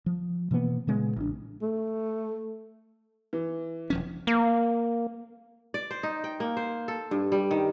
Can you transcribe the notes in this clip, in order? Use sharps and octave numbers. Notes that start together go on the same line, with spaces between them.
F3
B2 E3 A#3 B3
A#2 C#3 G#3 B3
A1 D4
A3
E3
E1 F3 C#4
A#3
D5
C5
D#4
G5
A#3
C5
A4
G2
G3
D#3